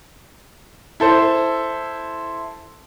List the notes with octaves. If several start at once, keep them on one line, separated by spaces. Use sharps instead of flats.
E4 A4 C5